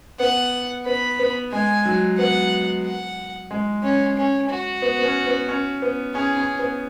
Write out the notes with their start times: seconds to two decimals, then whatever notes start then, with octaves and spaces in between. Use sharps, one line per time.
0.20 B3 F#5
0.86 B3 B5
1.19 B3
1.52 G#3 G#5
1.86 F#3
2.18 B3 F#5
2.85 F#5
3.51 G#3
3.83 C#4
4.17 C#4
4.50 F#4
4.82 B3
4.99 B3
5.05 C#4
5.27 B3
5.48 C#4
5.82 B3
6.15 C#4 G#4
6.37 C#4
6.59 B3